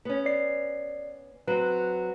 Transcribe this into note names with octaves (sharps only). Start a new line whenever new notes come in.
B3 C#4
D5 C7
F#3 C4 B4